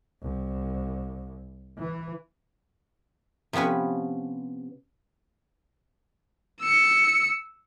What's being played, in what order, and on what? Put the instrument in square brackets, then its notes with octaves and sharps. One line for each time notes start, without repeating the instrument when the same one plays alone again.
[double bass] C2
E3
[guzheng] C3 F3 B3 C#4 B4
[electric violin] E6 C#7